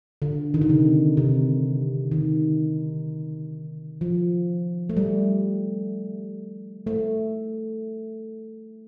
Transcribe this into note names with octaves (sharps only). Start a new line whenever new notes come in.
D3
D#3
D3
C3
C3
D#3
F3
A3
G3
A3